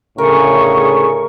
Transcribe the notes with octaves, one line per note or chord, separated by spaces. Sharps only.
D2 A2 C#3 G#4 A#4 C#6